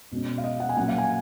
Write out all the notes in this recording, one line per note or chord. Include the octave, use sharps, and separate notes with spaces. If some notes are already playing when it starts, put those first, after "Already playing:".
B2 G#3 C#4
F5
D#5
F#5
G#5
A#2 F#3 A#3 C#4 F#5
F5
G#5